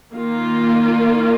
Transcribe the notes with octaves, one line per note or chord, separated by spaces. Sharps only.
D#3 A#3 F4